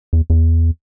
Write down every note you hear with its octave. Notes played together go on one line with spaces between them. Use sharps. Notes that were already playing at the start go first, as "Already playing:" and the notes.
E2
E2